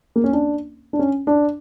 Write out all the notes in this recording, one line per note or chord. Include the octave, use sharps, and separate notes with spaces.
A#3
C#4
D4
D4
C#4
D4